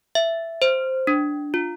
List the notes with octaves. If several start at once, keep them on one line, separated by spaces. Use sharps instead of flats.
E5
C5
D4
F4